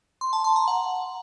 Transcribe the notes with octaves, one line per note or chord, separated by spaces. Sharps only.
C6
A5
C6
A#5
F#5